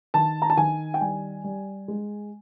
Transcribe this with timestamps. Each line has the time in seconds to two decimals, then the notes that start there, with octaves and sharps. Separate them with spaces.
0.14 D#3 A5
0.42 A#5
0.50 A5
0.57 D#3 G#5
0.94 G5
1.01 G3 G#5
1.44 G3
1.88 G#3